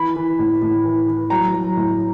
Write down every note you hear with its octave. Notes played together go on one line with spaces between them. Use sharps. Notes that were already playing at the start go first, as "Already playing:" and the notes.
Already playing: E3 B5
E3
A2
A2
E3
E3
F#3 A#5
F#3
A2